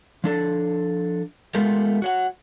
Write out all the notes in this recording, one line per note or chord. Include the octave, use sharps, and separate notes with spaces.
F3 D4 A4
G#3 A3 B3 F4 G4 A#4
F#4 C#5 F#5